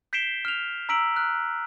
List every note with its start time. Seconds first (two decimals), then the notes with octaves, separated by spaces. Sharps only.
0.13 G6 B6 C7 D7 E7 G7
0.45 F6 F7
0.89 A#5 E6 B6 D7 F#7
1.16 F6 F#6